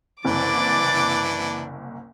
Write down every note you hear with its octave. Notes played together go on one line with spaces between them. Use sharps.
F#1 C2 E3 D4 D6 A6